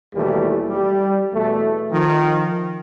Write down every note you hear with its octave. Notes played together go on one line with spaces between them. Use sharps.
D#2 B2 E3 G3 A3
G3
E2 B2 A3
D#3 F3